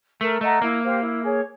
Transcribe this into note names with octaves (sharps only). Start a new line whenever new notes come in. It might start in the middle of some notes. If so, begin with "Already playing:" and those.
A3 A#4
A3 D#5 F#5 A#5
A#3 E4
G4 C5 F5
E4
G#4 C#5